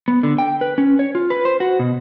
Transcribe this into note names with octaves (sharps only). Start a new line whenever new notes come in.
B3
D3
G5
B4
C#4
C#5
F4
B4
C5
F#4
B2